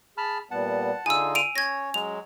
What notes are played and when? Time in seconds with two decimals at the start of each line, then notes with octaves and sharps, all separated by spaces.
0.17 G#4 A5 B5 F6
0.51 A#2 G3 B3 F#5 A5
1.06 D3 D#4 F4 G#4 G#5 E6
1.35 D7 D#7 F7
1.56 C#4 C#5 G#6 A#6
1.94 F#3 G#3 F7